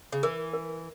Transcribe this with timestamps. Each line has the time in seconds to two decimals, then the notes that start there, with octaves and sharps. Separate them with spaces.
0.12 C#3
0.23 E3 A#4
0.53 A#4